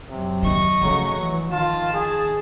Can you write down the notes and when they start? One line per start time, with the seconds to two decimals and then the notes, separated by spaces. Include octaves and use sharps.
0.10 F#2 C3 F#3
0.43 D#2 D#3 D#5 C#6
0.82 C#3 F3 F#3 A3
1.16 E3
1.51 D#3 F4 A5
1.94 G#4